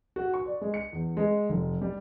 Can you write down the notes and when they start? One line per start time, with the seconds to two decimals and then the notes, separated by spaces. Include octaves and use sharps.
0.16 F#4
0.34 C#6
0.46 D5
0.61 G#3
0.74 C#7
0.93 E2
1.17 G#3
1.49 F1
1.82 G3